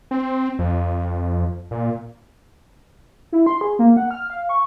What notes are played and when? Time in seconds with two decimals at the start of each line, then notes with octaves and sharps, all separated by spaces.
0.11 C4
0.59 F2
1.71 A#2
3.32 E4
3.46 C6
3.61 G#4
3.79 A#3
3.97 F#5
4.11 F6
4.30 F5
4.49 C#6